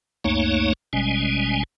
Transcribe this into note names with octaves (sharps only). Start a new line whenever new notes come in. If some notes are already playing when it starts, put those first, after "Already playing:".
C#2 F#2 A3 A#3 D#4 C#5
G#1 B2 G3 G#3 C#4 G#5